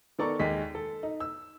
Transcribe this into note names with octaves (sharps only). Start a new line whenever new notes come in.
D#3 B3 A4 D5 A#5 C#6
D#2 G#3 B6
A4
D#4
E6